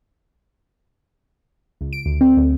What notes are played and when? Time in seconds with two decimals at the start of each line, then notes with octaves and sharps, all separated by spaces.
1.81 C#2
1.93 D7
2.06 D2
2.21 C4
2.37 D2